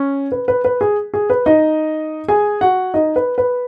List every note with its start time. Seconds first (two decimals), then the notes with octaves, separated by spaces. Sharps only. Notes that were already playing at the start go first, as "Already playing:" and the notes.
Already playing: C#4
0.32 B4
0.48 B4
0.65 B4
0.81 G#4
1.14 G#4
1.30 B4
1.46 D#4 D#5
2.28 G#4 G#5
2.61 F#4 F#5
2.94 D#4 D#5
3.16 B4
3.38 B4